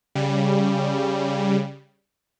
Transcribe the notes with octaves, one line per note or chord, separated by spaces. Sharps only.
C#3 G3